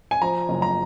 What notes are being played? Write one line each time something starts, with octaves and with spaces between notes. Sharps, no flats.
G#5
F3 A#5
F#1
A#5